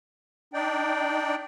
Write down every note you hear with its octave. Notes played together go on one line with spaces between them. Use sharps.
D4 D#4 D5 G5